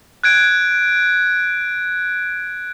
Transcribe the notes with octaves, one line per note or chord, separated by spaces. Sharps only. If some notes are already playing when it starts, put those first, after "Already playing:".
F#6 G#6 D7